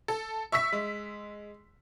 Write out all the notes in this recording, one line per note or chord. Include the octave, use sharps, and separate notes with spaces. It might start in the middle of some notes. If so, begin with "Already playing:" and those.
A4
E5 C#6 E6 B6
G#3